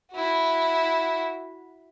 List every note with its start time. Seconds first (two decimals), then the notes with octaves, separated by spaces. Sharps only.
0.12 E4 F#4